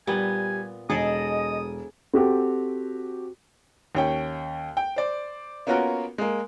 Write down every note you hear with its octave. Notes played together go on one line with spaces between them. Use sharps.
A#2 G3 B3 G#5
E1 G#4 A4 D5 D#5 D#6
C4 F#4 G4 A4
D#2 C#4 G5
G5
C5 D5
A#3 B3 C#4 F4 F#4 A#4
G#3 A#3